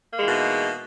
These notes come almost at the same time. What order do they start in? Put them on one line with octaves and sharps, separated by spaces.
A#3 G#3 E3 B2 D#4